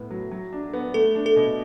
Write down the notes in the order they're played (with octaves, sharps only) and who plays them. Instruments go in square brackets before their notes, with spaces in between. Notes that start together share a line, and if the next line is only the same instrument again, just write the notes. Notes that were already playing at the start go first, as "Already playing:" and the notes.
Already playing: [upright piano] A2 B3
F#3
F#3
D4
B3
[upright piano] A3 [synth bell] A4
[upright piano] D4
[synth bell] A4
[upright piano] B2